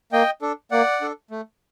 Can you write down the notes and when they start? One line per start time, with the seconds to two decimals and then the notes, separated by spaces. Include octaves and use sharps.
0.12 A#3 D#5 G5
0.42 D4 A4
0.71 A#3 D5 F#5
1.01 D4 A4
1.31 A3